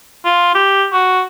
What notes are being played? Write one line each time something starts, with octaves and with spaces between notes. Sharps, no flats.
F4
G4
F#4